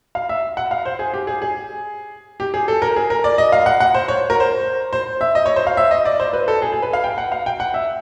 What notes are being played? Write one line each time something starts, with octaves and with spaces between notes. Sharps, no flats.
F5
E5
F#5
F5
C5
G#4
G4
G#4
G#4
G4
G#4
A4
A#4
G#4
A#4
D5
D#5
F5
F#5
F#5
C5
C#5
A#4
C5
C5
E5
D#5
C#5
C5
F5
E5
D#5
D5
C5
B4
A4
G#4
G#4
B4
F5
G5
F#5
F5
G5
F#5
E5